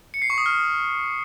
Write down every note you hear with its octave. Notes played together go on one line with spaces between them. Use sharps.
C#7
C7
C#6
D#6
F6